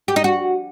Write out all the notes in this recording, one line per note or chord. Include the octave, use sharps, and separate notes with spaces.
G4
D#4
F#4